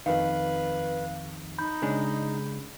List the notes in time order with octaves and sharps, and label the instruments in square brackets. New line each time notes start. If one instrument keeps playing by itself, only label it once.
[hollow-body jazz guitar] F2 D#3 [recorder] B4 [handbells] F5
[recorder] D#4 [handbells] B5 G6
[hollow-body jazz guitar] C#3 G#3 D4